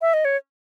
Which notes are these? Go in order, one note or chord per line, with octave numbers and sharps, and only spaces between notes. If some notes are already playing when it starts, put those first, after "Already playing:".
E5
D#5
C#5